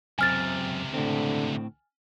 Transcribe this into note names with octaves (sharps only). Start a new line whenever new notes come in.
C#2 F#2 C3 C4 G#5 F6 A6
A2 D3 C4